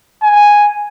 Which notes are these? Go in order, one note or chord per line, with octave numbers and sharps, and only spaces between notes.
G#5